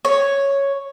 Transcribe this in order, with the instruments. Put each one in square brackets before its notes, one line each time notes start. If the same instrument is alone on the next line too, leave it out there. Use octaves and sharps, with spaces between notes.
[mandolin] C#5